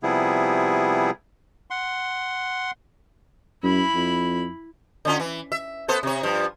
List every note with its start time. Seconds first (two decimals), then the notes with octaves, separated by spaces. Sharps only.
0.03 C3 F3 G3 B3 E4 G#4
1.70 F#5 C6
3.63 F#2 E4 B5
3.95 F2
5.05 D3 C#4 F4
5.20 E3
5.52 E5
5.88 B3 A4 C5
6.03 C3 C#5
6.23 G2 F3